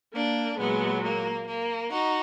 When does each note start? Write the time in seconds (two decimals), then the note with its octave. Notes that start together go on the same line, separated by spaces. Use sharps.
0.14 A#3 D4
0.58 A#2 F#3 G#3 B3
1.03 A#3
1.47 A#3
1.91 D#4 F#4